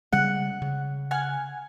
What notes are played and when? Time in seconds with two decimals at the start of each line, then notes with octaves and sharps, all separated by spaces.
0.13 C#3 G3 G#3 F#5
0.62 C#3
1.11 F#5 G#5 F6